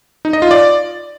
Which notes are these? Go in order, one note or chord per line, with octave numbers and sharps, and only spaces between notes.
D#4
D#5
F4
D5